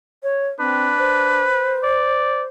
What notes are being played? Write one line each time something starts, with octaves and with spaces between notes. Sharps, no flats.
C#5
C4 D4 B4
C5
D5